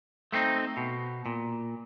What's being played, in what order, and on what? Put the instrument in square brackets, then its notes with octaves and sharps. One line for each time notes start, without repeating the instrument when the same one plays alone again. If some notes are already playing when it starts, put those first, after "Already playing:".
[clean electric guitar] A3 B3 C4 D#4
B2
A#2